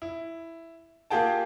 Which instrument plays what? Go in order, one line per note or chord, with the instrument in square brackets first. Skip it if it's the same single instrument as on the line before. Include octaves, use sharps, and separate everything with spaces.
[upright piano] E4
A#3 F4 G4 G#4 G5 A5